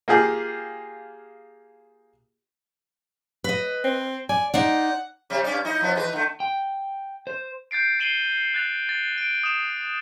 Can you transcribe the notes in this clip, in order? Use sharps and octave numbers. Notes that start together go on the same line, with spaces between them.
A#3 F4 G4 G#4
B4 D#5
C4
D5 G#5
D#4 C5 D5 F#5
C3 G3 C#4
G2 C#4 D5
D#4 E4 D#5
F3 B3 C#4
E3 G#4 B4
D3 A3
G5
C5
G6 A6 C7 D7
C7 D#7 E7 F#7 G7
F#6 A6 F7
A6
D7
D#6 E7